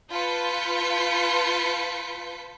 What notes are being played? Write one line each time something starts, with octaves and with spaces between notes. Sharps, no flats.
F4 B4 A5 G6 B6 C#7